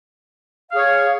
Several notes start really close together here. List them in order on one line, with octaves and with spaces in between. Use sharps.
F5 G#4 C#5